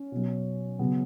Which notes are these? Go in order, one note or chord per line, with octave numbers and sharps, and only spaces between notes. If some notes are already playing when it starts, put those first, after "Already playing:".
Already playing: C#4
B2 F#3
C#3 F#3 B3